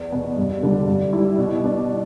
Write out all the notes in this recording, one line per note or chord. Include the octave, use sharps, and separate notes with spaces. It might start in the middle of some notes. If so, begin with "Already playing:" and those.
Already playing: E2
B2 B3
G2
D3 G3 D4
G2
G3 E4
B2
B3 D4